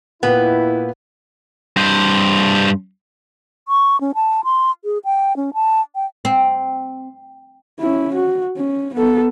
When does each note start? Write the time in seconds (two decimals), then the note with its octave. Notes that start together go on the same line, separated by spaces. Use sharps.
0.23 A#2 B3 E4 B4 G5
1.76 G2 C5
3.68 C#6
4.01 C#4
4.15 A5
4.44 C6
4.85 G#4
5.05 G5
5.36 C#4
5.54 A5
5.95 G5
6.25 C4
7.80 C#4 E4
8.14 F#4
8.57 C#4
8.94 B3 A4